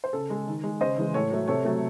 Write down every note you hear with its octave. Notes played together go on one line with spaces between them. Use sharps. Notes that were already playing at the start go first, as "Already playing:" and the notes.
C5
C#3 A4
G#3
D#3
G#3
C#3 C5 D#5
E3 G#3
A2 A4 C#5
F#3 A3
C3 A4 C#5
F#3 A3